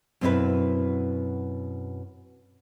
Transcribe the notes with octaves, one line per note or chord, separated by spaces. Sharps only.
F#2 B2 C4 D#4 E4 B4